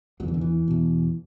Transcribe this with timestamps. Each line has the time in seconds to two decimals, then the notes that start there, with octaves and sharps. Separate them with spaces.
0.20 E2 F#3
0.23 D3
0.28 E3
0.34 D3
0.41 E3
0.68 E2 B2